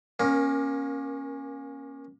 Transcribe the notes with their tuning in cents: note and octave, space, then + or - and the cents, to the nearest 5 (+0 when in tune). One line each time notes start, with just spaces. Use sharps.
A#3 +30 C#4 -15 A#4 +10